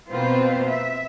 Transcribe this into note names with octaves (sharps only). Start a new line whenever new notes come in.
B2 A#3 C4 F4 B4 C5
E5